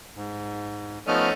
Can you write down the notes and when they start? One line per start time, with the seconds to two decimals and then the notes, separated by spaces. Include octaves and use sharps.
0.16 G#2
1.08 F3 A3 B3 C#4 D#4 F6